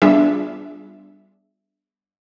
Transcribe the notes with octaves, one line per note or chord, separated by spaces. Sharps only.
G3 B3 D4 F4 G#4 E5